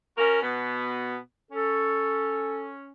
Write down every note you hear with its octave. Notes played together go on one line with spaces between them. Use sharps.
C#4 F#4 A#4
B2 B3
C#4 A4